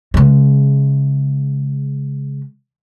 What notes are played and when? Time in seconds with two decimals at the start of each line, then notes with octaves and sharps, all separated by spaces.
0.14 C#3 G#3